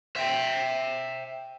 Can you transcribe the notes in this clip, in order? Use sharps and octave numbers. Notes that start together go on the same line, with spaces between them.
E5 G5